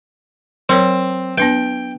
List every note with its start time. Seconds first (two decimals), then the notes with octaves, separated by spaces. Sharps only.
0.69 F#3 C4 A#4 C#5
1.38 B3 D4 B4 G5